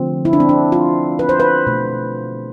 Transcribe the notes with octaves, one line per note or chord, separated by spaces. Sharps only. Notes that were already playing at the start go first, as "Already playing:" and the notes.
Already playing: D3 F3 A3 C4
E4
D4
C4
D4
F4
B4
C5
B4
B2 A3